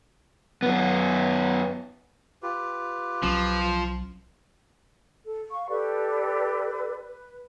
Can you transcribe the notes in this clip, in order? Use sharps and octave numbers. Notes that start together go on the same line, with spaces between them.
F#2 B3
F4 G4 B4
B1 F3 F#3 C#4
A4
F5 C#6
G4 A4 B4 D5
B4